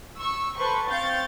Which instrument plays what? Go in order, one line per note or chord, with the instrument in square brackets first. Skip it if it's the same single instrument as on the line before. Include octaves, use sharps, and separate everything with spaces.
[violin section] C#6 E6
A4 B4 C5 C#6
C4 F5 C#6 G6 A6